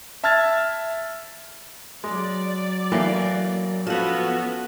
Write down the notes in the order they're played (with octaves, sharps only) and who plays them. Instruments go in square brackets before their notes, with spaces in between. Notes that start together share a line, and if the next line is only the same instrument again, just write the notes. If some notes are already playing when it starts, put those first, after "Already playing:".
[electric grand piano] E5 A5 E6 F6 G#6 A6
[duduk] F#3 [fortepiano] G#3 [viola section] D5
[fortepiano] A2 E3 [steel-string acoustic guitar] A#3
[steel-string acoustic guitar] F3 F#5 [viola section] B3 C#4 F#4 [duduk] A4